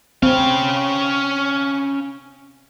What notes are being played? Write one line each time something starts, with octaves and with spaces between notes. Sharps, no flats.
C4 C#4 F5